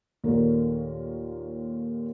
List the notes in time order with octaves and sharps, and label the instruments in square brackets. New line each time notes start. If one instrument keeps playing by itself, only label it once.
[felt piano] D#2 A#2 D#3 A3 A#4